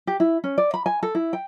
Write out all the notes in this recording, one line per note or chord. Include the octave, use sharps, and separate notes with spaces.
G4
E4
C#4
D5
B5
G#5
A4
E4
G5